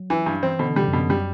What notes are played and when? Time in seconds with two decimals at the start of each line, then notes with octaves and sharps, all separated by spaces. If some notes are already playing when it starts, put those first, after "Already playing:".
Already playing: F#3
0.10 E3
0.26 G2
0.43 E3 C4
0.59 B2 D3
0.76 C3 G3
0.88 F#2
0.93 B2
0.99 F#2
1.10 G3